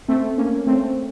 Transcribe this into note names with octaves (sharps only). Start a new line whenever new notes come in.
A3 C4
A#3 C#4
A3 C4